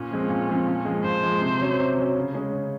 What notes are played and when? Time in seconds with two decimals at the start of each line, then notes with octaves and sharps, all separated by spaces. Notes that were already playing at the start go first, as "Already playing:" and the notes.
Already playing: A#2 C#4
0.11 F3 G#3 C4
0.30 A#2
0.49 F3 G#3 C4
0.67 A#2
0.85 F3 G#3
1.04 A#2 C5
1.23 F3 G#3
1.41 C3
1.60 F#3 C#4
1.79 C3
1.97 F#3 C#4
2.16 C#3
2.34 G#3 C#4 G#4
2.53 C#3